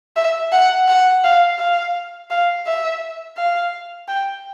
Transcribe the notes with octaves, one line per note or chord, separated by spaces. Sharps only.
E5
F#5
F#5
F5
F5
F5
E5
F5
G5